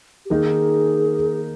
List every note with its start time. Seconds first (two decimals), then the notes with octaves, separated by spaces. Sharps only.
0.25 G4
0.30 D#3 A#3 D#4 G#4